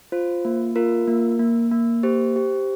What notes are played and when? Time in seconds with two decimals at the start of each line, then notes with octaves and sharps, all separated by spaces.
0.12 F4 C5
0.45 A#3
0.76 F4 A#4
1.07 A#3
1.39 A#3
1.71 A#3
2.03 G4 C5
2.36 G4